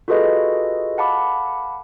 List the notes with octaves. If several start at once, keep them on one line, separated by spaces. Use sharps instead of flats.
F4 F#4 G#4 A4 B4 D#5
F5 F#5 A5 B5 D6